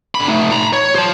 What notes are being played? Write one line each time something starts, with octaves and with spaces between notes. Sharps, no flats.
D3 B5
A3 D#4
A#5 B5
C#5
C5 A5